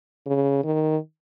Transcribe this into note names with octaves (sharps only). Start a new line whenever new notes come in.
C#3
D#3